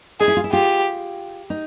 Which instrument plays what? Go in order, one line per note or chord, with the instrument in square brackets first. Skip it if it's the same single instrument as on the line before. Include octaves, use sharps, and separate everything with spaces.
[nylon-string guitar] D#4 [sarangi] G#4
[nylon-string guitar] E4
F4
E4
[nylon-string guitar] F4 [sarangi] G4
[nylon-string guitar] D#4